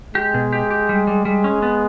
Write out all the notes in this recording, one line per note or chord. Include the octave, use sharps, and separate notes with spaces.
G#3 G4
B2
G4
G4
G3
G3
G3 G#3
C#4
B3